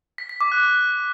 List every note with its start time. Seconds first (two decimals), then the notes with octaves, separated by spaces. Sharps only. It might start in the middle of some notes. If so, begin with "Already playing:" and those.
0.18 B6
0.29 B6
0.41 D6
0.52 F#6